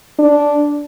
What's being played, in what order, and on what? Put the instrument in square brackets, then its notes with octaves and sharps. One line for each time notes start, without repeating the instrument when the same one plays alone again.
[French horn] D4